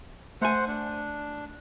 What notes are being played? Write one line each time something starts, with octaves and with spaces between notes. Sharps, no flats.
A3 C5 F#5 G#5
D4